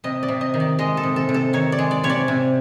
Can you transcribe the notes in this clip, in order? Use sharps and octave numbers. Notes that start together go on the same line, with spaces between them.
C3 D#5
D5
C3
D#5
D#3
D5
G#3 D#5
A4
C3
A4
C3
A4
D#3 C#5
D5
G#3
D5
C3 C#5
D5
C3